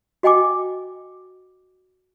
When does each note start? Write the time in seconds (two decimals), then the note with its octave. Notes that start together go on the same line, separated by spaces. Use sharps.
0.23 F#4 D#5 G5 G#5 D6